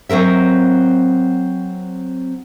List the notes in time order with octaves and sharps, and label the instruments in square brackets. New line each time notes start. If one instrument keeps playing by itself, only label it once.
[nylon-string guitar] F#3 C4 A#4 E5